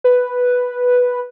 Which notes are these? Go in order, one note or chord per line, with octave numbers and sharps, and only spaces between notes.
B4